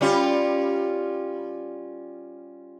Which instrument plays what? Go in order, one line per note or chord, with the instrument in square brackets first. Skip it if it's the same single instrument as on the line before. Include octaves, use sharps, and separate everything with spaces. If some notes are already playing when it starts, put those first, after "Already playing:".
[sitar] G3 C#4 F4